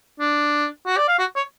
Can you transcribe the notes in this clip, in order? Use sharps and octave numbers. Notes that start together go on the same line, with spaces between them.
D4
F#4
D5
F5
F#4
C#5